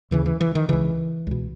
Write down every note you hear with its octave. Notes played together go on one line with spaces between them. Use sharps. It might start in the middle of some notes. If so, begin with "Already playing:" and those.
D#2 C#3 E3
E3
E3
D#3
C#2 C#3 E3
C#2 B2